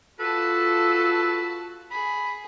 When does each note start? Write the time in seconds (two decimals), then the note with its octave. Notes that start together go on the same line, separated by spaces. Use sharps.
0.20 F4 F#4 A4 B4 A5
1.91 G#4 B5